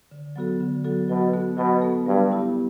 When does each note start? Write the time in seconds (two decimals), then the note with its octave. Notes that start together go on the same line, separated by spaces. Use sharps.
0.11 D3
0.36 F#3 B3 F#4 A4
0.61 D3
0.84 F#3 B3 F#4 A4
1.09 B2 F#3
1.33 B3 F#4 A4
1.57 B2 F#3
1.82 B3 F#4 A4
2.06 G2 G3
2.31 B3 E4 G4